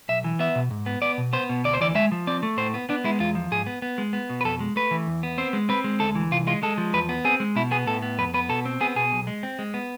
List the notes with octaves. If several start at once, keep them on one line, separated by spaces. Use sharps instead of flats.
B1 E5
E3
B3 E5
B2
G#2
B3
B3 D5
B2
B3 C5
B2
D2 D5
C5
E3 D5
G#3 E5
F3
C4 D5
A3
A2 C5
B3
B3 D4
G#3 E4
E2 F4
F3
G#2 G#4
B3
B3
G#3
B3
B2
B4
F2 A4
G#3
A3 B4
E3
E2
B3
C4 C5
G#3
C4 B4
G#3
D2 A4
E3
C2 F4
G#3 F4
G#3 A4
F3
E2 B4
B3
C4 G#4
G#3
B2 E4
B3 G#4
A2 A4
B3
F2 B4
B3 B4
B2 A4
C4
B3 G#4
B2 G#4
B1
G#3
C4
G#3
B3